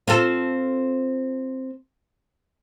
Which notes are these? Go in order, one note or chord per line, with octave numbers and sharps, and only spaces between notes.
C4 F4 A4